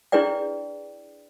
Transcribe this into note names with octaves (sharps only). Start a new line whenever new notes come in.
D4 E4 G#4 B4 D5 G5